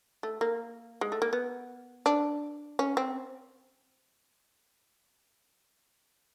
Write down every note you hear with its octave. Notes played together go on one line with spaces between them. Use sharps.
A3
A#3
G#3
A3
A#3
B3
D4
C#4
C4